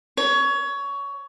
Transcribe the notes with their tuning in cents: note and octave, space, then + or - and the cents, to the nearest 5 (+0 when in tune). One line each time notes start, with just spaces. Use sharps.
C#5 +20